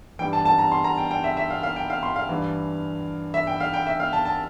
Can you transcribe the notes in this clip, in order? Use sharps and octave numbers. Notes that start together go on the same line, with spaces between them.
G2 E3 G5
A5
A5
A#5
C6
A#5
G5
G5
E5
E5
F5
F5
G5
F5
C6
F5
G2 E3
E5
G5
F5
G5
E5
F5
A5
A5